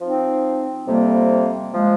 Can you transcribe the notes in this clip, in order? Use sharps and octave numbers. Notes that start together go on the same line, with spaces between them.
F3 C4 D#4
F2 C3 G3 A#3
F3 G#3